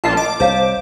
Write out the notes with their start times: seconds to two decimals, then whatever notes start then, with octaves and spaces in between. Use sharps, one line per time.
0.04 A#1 A#2 F4 A5
0.17 D#5 D6
0.40 C2 C5 C#5 F5